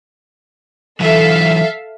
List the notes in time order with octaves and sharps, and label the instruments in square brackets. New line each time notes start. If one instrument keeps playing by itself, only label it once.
[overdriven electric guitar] E3 F#3 [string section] A4 E5 F5